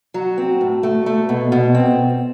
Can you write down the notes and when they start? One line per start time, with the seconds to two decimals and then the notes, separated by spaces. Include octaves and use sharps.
0.14 F#3 F#4
0.38 C4
0.61 A2
0.83 A3
1.06 A3
1.29 B2
1.52 B2
1.75 C4